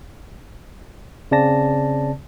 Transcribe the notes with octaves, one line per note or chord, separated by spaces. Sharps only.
C#3 C4 D5 A5 A#6